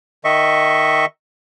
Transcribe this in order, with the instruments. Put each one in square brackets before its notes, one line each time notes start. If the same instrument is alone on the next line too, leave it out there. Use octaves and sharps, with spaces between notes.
[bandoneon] D#3 D#5 E5 C#6